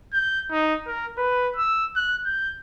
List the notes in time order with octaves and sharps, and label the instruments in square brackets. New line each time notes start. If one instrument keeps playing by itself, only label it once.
[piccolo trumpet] G6
D#4
A#4
B4
E6
F#6
G6